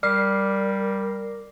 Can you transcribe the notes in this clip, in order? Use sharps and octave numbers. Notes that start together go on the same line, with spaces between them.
G3 A#4 D5 D6 F6 C7